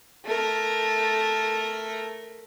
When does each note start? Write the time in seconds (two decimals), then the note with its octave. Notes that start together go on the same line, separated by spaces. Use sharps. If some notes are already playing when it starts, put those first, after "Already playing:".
0.25 A3 A#4